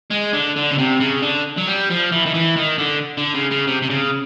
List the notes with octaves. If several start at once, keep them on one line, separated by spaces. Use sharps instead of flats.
G#3
D3
D3
C#3
C3
C#3
D3
F#3
G3
F3
E3
D#3
E3
D#3
D3
D3
C#3
C#3
C3
C3
C#3